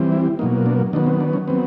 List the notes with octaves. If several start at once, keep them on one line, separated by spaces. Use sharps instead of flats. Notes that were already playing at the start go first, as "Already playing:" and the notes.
Already playing: E3 G3 C4
E4
B2 F#3 A#3 D#4
D4
D#3 F#3 B3 D4
C4
D4
C#4
F#3 B3 C4